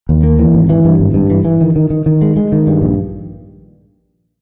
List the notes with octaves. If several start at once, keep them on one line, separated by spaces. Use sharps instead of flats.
D#2
A#3
E3
G#1
E3
G2
G#1
G2
E3
E3
D#3
D#3
D#3
D#3
G#3
G#3
D#3
G2
A#1